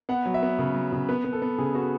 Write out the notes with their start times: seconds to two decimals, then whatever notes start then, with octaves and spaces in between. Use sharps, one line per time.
0.09 B3 F#5
0.26 F#3
0.34 E5
0.43 B3
0.59 C#3
0.75 F#3
0.92 C#3
1.09 B3 B4
1.24 B3
1.33 A4
1.42 B3
1.58 C#3 G#4
1.75 B3 F#4